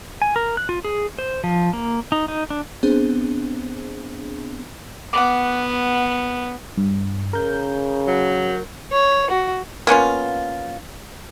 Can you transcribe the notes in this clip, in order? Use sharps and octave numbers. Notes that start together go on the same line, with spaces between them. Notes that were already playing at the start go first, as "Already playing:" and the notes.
G#5
A#4
F#6
F4
G#4
C5
F3
A#3
D#4
D#4
D4
B3 C4 D4 G#4 C5
B3 F#5 D6
G2
C#3 A#4 G6
F#3
C#5
F#4
A#3 B3 C#4 F4